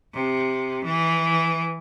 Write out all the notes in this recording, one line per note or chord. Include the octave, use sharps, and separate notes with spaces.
C3
E3